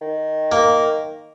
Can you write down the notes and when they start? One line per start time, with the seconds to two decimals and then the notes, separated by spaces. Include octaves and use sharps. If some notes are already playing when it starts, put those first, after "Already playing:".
0.01 D#3
0.52 A#3